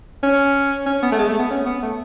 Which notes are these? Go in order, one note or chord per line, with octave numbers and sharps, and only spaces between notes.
C#4
C#4
B3
A3
G#3
A3
B3
C#4
B3
A3